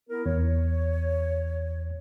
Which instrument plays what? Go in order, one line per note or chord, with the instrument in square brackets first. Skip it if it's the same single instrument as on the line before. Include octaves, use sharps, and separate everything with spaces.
[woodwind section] B3 E4 A#4
[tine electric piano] E2 [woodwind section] C#5